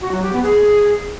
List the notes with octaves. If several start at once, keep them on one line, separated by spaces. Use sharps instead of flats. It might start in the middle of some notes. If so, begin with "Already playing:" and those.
F#4
F#3
G4
B3
G#4